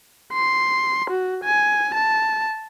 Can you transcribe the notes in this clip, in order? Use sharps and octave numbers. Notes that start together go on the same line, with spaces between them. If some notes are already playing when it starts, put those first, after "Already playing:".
C6
F#4
G#5
A5